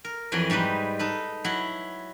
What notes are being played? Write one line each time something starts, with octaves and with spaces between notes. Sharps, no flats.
A#4
F2 E3 F#3 D5 G#5
G#2 G3 D#4 B4
D#4 A4 B4
F#3 E4 F#5